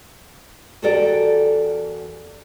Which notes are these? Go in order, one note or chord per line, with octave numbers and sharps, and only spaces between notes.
E2 F#4 G4 A4 A#4 D5